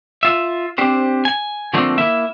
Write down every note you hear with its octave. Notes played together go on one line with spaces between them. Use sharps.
F4 E5
C4 D4 G4 C5
G#5
D3 F3 A3 A#3 C4 D4
A#3 E4 E5